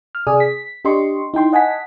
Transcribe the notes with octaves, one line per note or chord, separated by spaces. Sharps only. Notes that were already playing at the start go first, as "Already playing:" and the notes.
F6
C3 G#4 D5 G#5 D#6
B6
D4 G4 D#5 C6 C#6
D#4 E4 G5 C6
D#5 F#5 G#5 A5 B6